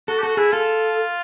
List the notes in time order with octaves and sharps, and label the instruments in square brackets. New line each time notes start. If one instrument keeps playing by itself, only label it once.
[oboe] F#4 [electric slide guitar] A4
[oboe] G4
[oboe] F#4 [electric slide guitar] A4
[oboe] E4 [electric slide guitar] G#4
[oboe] F4 [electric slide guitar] A4